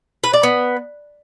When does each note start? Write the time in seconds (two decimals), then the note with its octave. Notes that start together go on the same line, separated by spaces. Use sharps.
0.24 B4
0.33 D5
0.43 B3